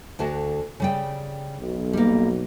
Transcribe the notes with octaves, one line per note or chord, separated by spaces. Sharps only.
D2 D3 F#4
C#3 G3 G5
B1
G3 A#3